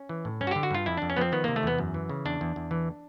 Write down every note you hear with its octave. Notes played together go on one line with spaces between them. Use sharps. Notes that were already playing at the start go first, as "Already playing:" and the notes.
Already playing: C#4
E3
A2
G2 C#4
F#4
D3 G4
F#4
G2 F4
F2 E4
F2 D4
C#4
F3 B3 C4
D#3 B3
C3 A#3
A3
E2 B3
F#2
E3
C#3
E2 D4
E2
E2
E3